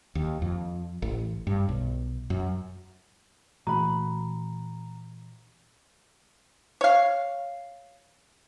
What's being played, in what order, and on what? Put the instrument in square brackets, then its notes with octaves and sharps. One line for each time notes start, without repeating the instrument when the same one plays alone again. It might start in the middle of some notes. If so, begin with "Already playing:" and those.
[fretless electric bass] D#2
F2
A1
G2
B1
F#2
[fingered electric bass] A#2 E3 A3 [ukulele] F#4 B5 [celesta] A#5
[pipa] C#5 F5